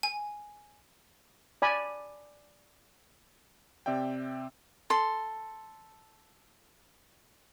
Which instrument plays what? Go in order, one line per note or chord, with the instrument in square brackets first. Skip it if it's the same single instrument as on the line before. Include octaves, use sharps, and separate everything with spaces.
[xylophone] G#5
[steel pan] D5 G#5 B5
[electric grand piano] C3 C4 D5 E5 G5
[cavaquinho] A4 C6